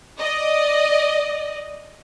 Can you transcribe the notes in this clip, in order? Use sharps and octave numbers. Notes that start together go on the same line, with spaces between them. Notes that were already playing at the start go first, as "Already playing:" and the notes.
D5 D#5